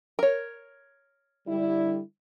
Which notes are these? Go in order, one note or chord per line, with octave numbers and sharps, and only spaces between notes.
A#4 C#5
D3 G3 E4